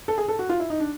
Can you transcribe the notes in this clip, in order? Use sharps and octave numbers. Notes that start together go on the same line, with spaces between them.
A4
G#4
A4
F#4
F4
E4
D#4
D4